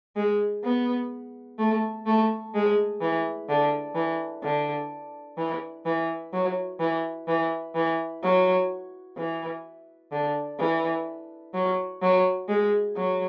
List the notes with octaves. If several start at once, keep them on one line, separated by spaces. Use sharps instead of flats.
G#3
B3
A3
A3
G#3
E3
D3
E3
D3
E3
E3
F#3
E3
E3
E3
F#3
E3
D3
E3
F#3
F#3
G#3
F#3